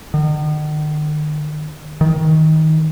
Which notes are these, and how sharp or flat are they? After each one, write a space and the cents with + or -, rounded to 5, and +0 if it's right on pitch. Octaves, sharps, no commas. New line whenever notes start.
D#3 -45
D#3 +20